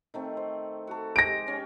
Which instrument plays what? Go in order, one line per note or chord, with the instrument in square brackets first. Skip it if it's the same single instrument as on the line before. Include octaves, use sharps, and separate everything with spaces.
[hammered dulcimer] D#3 A3 C4
C5
F#4 A4
[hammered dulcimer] G#3 G4 [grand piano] A#6 D7
[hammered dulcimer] C#4 G5